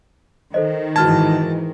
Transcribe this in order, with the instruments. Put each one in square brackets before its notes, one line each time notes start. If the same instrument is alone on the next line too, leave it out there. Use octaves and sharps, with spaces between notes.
[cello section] D#3 [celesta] A4 C5 D#5
[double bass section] G#2 E3 [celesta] F#4 F6 G#6 [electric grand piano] A5